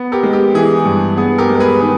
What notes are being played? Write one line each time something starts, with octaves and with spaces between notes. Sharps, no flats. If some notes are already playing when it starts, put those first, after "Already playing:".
Already playing: B3
G4 A#4
G#3
G4
E3 G#4
G2
B3 G#4
G4 A#4
G#3
A#4
G#4 B4
D#3 G#4 B4